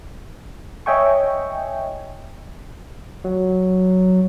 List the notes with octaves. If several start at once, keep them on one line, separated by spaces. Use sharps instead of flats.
C#5 D#5 E5 G5 G#5 C#6
F#3